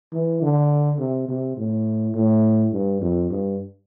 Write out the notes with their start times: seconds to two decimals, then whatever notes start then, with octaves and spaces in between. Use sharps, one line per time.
0.13 E3
0.42 D3
0.99 C3
1.28 C3
1.57 A2
2.15 A2
2.73 G2
3.01 F2
3.30 G2